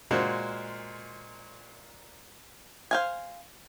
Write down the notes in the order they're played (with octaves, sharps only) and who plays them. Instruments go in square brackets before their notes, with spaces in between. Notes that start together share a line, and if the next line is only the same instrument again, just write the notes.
[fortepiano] A#2 G#3 A#3 F#4 C5
[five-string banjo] C5 F5 G#5